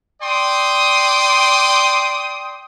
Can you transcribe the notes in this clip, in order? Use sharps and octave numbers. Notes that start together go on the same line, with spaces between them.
D5 G5 C6 D#6